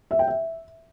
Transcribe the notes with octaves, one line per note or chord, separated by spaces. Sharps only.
E5
G5
E5